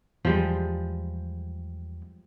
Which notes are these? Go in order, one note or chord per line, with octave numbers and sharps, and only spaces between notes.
E2 F3 G3 G#3